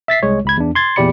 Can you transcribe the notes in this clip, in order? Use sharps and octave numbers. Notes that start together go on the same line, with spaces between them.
E5 A6 B6 C7
C2 G#3 C#5
C#2 B5 G#6
E2 D4
C6 G#6 A6
E2 A#2 G4 D5 B5 C#7